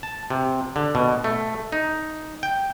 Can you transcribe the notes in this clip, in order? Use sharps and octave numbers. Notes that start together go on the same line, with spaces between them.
A5
C3
D3
B2
A3
D#4
G5